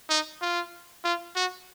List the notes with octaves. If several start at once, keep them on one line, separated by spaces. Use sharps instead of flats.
D#4
F4
F4
F#4